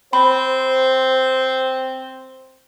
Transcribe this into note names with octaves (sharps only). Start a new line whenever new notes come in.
C4 C5 B5